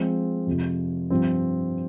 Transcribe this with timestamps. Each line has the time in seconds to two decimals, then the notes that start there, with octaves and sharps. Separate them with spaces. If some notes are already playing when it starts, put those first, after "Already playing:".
Already playing: F3 G#3 C4 F4
0.47 F2 C3 F3
1.10 G2 F3 C4